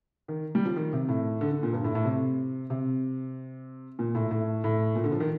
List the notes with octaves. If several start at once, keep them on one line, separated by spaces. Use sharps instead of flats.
D#3
G3
F3
D#3
C3
A2
D3
D3
A#2
G2
A2
A2
C3
C3
A#2
A2
A2
A2
A#2
D3
F3
D#3